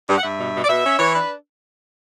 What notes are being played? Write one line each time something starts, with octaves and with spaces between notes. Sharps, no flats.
G2
F#5
G2 E5
B2
B2
D5
B2 E5
C#4
E3 C#5
D4 B4